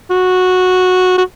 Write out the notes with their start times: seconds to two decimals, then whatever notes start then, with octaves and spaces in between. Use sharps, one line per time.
0.10 F#4
1.18 F#4